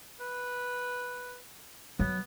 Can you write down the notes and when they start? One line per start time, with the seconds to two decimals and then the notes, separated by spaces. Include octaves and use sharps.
0.20 B4
1.99 F#3 B3